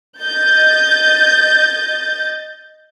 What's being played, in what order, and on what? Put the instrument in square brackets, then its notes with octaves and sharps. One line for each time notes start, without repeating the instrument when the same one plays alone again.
[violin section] D#5 G6 A6